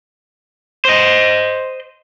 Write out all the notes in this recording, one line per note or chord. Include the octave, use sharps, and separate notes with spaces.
C5 D#5